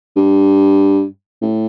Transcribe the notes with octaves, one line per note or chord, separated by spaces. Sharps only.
G2
A2